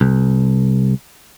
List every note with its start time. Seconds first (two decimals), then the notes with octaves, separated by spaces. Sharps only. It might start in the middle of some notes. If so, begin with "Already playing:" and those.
0.01 C2